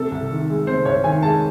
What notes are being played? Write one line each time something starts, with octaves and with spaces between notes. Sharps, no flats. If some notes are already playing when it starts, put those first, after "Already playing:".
Already playing: C3 A4
C2
D#3
G#3
C3 C5
C2 C#5
D#3 G#5
G#3 A5